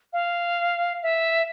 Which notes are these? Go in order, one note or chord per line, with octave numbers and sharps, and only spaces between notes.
F5
E5